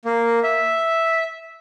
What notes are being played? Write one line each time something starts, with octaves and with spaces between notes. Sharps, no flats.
A#3
E5